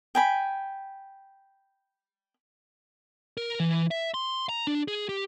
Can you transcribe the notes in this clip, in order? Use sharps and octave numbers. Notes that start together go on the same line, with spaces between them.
G5 G#5 B5
A#4
E3
E5
C6
A#5
D4
G#4
G4